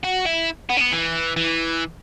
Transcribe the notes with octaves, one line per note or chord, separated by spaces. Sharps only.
F#4
E4
B3
C#4
B3
E3
E3